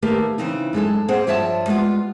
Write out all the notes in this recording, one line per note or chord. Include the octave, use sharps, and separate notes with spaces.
D#3 A3 A#3 G4 A#4 B4
C#3 E3 C4 D#4
F#2 G#3 D#4 A4
A#3 C4 G#4 C5 F#5
G2 F3 C#5 E5 G5 A5
G3 G#3 B3 F4